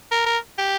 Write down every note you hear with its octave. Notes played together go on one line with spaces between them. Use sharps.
A#4
A#4
G4